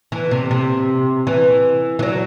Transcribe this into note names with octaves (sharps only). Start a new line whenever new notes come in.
E3
C3
C3
E3
E3
F#3